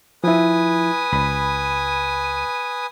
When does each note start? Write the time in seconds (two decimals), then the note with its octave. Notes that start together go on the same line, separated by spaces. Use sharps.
0.24 F3 E4 B4 G#5 D#6
1.12 C#2 B5